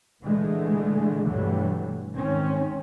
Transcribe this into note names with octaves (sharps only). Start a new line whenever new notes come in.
A#2 D3 E3 G#3 A3
G2 B2 E3 F#3 G3 A3
G#2 D#3 C4 C#4